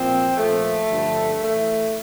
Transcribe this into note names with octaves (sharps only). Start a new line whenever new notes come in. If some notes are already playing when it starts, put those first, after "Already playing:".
Already playing: A#2 F3 C4
A#2 F3 A3
G2 D3 F3
A2 E3 A3